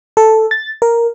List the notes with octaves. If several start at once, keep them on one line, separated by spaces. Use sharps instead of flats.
A4
A6
A#4